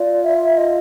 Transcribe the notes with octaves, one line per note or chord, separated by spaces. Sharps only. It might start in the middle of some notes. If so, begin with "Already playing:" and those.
Already playing: F4 D5
E5
D#5